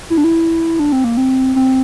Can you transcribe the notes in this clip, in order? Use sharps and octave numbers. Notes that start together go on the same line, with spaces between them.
E4
D4
E4
D4
C4
A#3
C4
C4